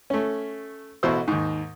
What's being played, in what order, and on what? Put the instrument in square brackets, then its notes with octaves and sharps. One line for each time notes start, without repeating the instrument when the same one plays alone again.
[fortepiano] A3 C#4
A1 B2 E4 F#4 C5 E6
D#2 G#2